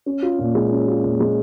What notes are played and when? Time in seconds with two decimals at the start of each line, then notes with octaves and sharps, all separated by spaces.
0.06 C#4
0.22 F4
0.39 A#2
0.55 G#3
0.71 C#4
0.88 F4
1.03 A#2
1.20 G#3